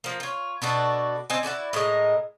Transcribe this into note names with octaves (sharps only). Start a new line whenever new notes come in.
F3 A#3
F4 C#5
B2 D4 F#4 A4
C4 D#5 G#5
E4 F#4 A4 D5
A2 G#3 A#4 D#5